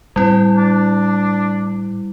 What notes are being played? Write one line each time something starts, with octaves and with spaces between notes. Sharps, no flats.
A2 G3 C4 E4
D4